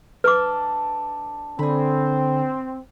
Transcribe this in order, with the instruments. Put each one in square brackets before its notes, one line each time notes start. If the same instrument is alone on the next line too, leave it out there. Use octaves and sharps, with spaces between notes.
[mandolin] D4 A4 [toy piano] B4 D6
[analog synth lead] D3 [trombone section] C4 [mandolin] G#4 B5